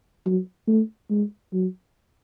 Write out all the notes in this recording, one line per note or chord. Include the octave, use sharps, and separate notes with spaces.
F#3
A3
G#3
F#3